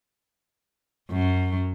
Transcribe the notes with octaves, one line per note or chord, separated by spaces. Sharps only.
F#2 F#3